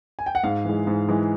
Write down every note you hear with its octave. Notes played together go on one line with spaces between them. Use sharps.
G#5
G5
F#5
G#2 F5
E3 G#3
G#2
E3 G#3